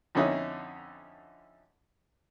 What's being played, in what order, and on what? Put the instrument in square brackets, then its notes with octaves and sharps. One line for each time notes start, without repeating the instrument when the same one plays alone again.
[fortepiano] F2 D3 C#4 D#4 E4